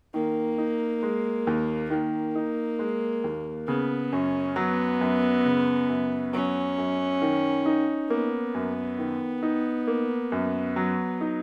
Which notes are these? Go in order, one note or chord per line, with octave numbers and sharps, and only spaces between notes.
D#3 A#3
D#4
G#3
D#2
D#3 A#3
D#4
G#3
D#2
C#3 B3
F#2 C#4
F#3 B3
F#2
C#3
F#2
F#3 C#4
F#2
D#3
D#4
A#3 B3
F#2
D#3
D#4
A#3
F#2
F#3
D#4